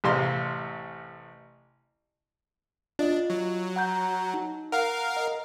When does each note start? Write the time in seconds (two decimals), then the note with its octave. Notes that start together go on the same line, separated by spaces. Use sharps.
0.04 A1 C3 F5 C6
2.99 D4 F4 D#5
3.30 F#3
3.76 F#5 A#5 G6
4.34 D#4
4.72 A#4 F5 F#5
5.17 D#5